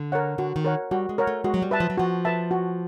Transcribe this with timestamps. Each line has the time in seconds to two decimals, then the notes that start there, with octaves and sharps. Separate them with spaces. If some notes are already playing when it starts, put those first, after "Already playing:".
Already playing: D3
0.12 A#4 C#5 F#5
0.38 D3 F#4
0.56 D#3
0.65 A#4 C#5 F#5
0.91 G3 F#4
1.09 G#3
1.18 A#4 C#5 F#5
1.27 A3
1.44 G#3 F#4
1.54 F#3
1.62 G3
1.71 B4 E5 A5
1.80 F3
1.90 F#3
1.97 F3 F#4
2.25 B4 E5 A5
2.51 F#4